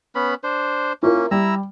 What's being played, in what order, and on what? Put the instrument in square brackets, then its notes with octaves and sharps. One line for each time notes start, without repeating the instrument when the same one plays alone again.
[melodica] B3 C#4 B5
D4 C5
[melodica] A#3 C#4 [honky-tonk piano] E4 F4 A#4
[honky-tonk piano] G3 [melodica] E4 A#5 E6